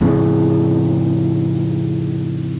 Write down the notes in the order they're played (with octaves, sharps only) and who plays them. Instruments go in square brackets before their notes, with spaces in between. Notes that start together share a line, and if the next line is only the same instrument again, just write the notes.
[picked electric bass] F2 A2 C#3